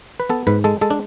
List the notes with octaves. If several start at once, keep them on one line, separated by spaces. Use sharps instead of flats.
B4
B3 A4
G#2 B4
G#3 A4
G#3 A4
D4